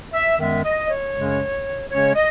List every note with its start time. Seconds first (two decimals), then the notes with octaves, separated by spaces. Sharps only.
0.13 E5
0.39 F#2 D#3 G#3 B3 E5
0.64 D#5
0.89 C#5
1.14 F#2 C#3 G#3 C#4
1.90 C#3 G#3 C#4 C#5
2.15 D#5